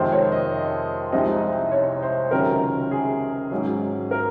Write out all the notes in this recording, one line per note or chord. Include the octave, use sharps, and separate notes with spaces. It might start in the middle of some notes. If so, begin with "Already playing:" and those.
Already playing: F2 C3 D#3 G#3 C5
C#5
D#5
C2 C3 F3 G#3 D#4
C#5
C5
C#2 C3 D#3 F#3 C#4 A#4
G#4
G#1 G#2 F#3 C#4
A#4